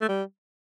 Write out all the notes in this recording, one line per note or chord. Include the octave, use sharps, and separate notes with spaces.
A3
G3